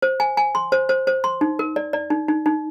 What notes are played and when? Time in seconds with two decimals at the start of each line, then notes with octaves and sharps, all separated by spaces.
0.02 C5
0.20 G#5
0.37 G#5
0.55 C6
0.72 C5
0.89 C5
1.07 C5
1.24 C6
1.41 D#4
1.59 A#4
1.76 D5
1.93 D5
2.10 D#4
2.28 D#4
2.46 D#4